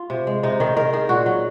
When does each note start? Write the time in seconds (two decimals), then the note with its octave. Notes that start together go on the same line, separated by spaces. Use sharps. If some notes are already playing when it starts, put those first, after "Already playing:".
Already playing: F4
0.10 C3
0.27 G#3
0.43 C3 D#4
0.60 D#3 G#4
0.77 D#3 A#4
0.93 D#3 G#4
1.09 A#2 F#4
1.26 F#3